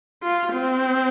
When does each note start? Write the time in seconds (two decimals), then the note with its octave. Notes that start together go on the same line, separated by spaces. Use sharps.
0.23 F4
0.52 C4